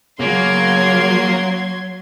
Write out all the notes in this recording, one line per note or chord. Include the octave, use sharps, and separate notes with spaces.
C#3 F#3 A#3 C6 G#6